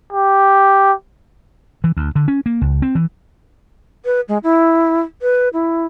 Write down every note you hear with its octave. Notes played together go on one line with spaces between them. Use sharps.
G4
E3
D2
D3
C#4
A#3
C#2
C4
E3
B4
G#3
E4
B4
E4